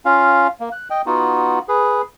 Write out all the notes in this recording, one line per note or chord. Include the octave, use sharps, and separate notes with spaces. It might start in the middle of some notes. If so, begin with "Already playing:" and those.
C#4 F4 F5
A#3
F#6
D#5 G5
B3 D#4 F4 F#4
G#4 B4